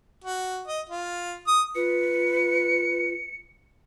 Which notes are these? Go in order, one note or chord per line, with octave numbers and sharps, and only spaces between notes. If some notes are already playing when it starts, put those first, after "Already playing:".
F#4
D#5
F4
D#6
F4 B4 C#7